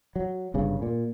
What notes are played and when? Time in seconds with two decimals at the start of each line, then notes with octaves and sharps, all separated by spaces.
0.16 F#3
0.54 G1 G2 C#3
0.82 A#2